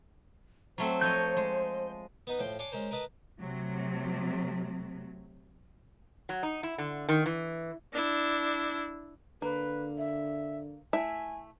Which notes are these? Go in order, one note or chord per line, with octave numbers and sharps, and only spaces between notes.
F#3 A3 C4 C5
F3 C#5 D#5 G6
G#3
B3 D#4 B4
A2 F3 G5 C6
D4 C#5 G#5 C6 D6
G#3 C#4 A#4 C5
A#4 B4 D#5 A5 B5
C3 F#3 A3
F#3
D#4
E4
D3
D#3
E3
D4 E4
D3 A#3 B4
E5
A3 E4 E5 G#5